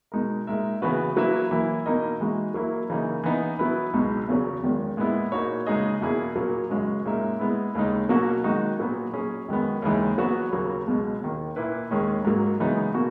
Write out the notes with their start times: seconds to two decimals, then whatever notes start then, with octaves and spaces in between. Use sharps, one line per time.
0.12 B2 G#3 D#4 A#4
0.47 A#2 G#3 D#4 A#4 E5
0.82 C#3 E3 B3 F#4 B4
1.17 F#3 A#3 E4 B4 E5
1.51 E3 A#3 E4
1.86 B2 A#3 D#4 A#4 D#5
2.20 E3 G#3 D#4 F#4
2.54 F#3 A#3 E4
2.90 C#3 E3 A#3 D#4
3.24 E3 B3 D#4
3.59 F#3 B3 E4 B4
3.93 C#2 B2 G#3 D#4
4.28 E2 C#3 F#3 C#4
4.63 E2 D#3 G#3
4.97 A#2 G#3 B3 E4
5.32 A#2 A#3 D#4 F#4 C#5
5.67 C#3 G#3 D#4 G#4 D#5
6.01 E2 B2 A#3 E4 G#4
6.36 A#2 F#3 A#3
6.70 F#2 C#3 G#3 C#4 F#4
7.05 A#2 G#3 D#4 A#4 E5
7.39 G#3 B3 E4
7.75 D#2 C#3 G#3 D#4
8.09 B2 F#3 A#3 C#4 F#4
8.44 D#3 G#3 D#4 F#4
8.79 A#2 F#3 B3
9.14 F#3 C#4 G#4
9.49 F#2 D#3 G#3 B3
9.82 D#2 C#3 E3 G#3 D#4
10.18 F#3 B3 F#4 C#5
10.52 D#2 C#3 F#3 A#3
10.86 C#2 B2 G#3
11.22 D#2 D#3 A#3
11.56 A#2 A#3 E4 B4
11.90 D#2 D#3 G#3 C#4 G#4
12.25 G#2 F#3 A#3
12.60 C#3 E3 G#3 B3 D#4
12.94 B2 A#3 F#4